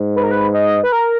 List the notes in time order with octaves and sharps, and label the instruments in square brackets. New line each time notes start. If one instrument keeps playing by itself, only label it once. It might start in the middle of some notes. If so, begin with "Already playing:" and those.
Already playing: [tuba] G#2
[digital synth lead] B4
A#4
B4
D#5
B4
A#4